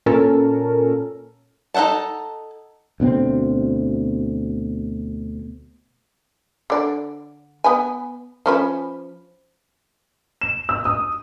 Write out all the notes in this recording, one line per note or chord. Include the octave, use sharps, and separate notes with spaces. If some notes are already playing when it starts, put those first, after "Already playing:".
A#2 C#4 A4 A#4
D#4 A4 E5 F#5 A5
D2 B2 B3 C4
D3 D5
B3 B4 G#5
F3 C#4 B4
E7
E6
D#6